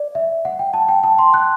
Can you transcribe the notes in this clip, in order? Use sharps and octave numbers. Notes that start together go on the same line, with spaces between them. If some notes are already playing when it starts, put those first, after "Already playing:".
Already playing: D5
E5
F#5
G5
A5
G5
A5
C6
F#6